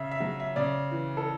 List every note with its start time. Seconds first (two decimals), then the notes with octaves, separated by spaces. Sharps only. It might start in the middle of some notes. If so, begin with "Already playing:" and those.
Already playing: C#3 E5
0.11 E5
0.20 F#3
0.40 E5
0.56 C#3 D5
0.91 E3
1.17 A4